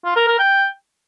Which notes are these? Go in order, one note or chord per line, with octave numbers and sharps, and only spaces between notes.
F4
A#4
A#4
G5